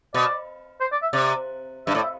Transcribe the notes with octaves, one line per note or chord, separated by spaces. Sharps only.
B2 D5
C5
D5
E5
C3 D5
G2 E5
A2 D5
E5